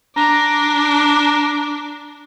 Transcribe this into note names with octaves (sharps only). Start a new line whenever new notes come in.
D4 D5 A#5